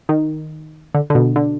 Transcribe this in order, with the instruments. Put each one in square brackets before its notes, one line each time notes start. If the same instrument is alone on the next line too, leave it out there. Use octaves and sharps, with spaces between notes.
[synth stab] D#3
D3
D3
B2
D3